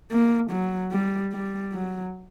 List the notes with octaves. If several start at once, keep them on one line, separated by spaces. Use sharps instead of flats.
A#3
F#3
G3
G3
F#3